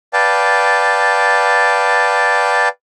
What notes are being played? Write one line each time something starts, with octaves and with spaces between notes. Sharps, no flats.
B4 D5 F5 G5 A5